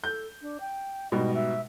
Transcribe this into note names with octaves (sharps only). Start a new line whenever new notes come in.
A4 G6
D4
G5
G#2 B2 G3 D#5
E5